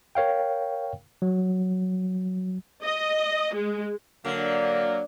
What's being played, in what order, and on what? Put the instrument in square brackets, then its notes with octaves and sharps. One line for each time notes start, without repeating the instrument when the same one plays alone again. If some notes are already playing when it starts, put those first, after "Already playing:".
[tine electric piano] A#4 C#5 F5 G5
F#3
[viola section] D#5
G#3
[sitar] D3 [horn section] F#3 A#3